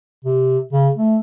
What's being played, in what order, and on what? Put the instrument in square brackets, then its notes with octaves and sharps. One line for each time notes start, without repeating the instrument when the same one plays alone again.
[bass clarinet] C3
C#3
A3